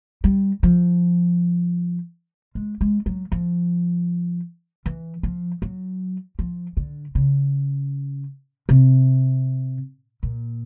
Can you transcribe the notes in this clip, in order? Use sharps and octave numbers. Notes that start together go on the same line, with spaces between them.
G3
F3
G#3
G#3
F#3
F3
E3
F3
F#3
F3
D3
C#3
C3
A#2